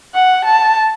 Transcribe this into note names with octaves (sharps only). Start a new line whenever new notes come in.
F#5
A5